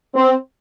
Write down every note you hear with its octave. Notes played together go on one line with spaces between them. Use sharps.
C4